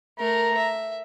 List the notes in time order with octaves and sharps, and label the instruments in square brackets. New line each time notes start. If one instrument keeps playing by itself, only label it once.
[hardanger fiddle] A3 A#4 [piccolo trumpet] A#5
[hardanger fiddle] E5